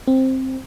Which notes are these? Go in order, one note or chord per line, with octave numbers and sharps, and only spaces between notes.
C4